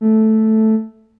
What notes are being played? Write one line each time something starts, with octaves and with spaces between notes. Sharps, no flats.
A3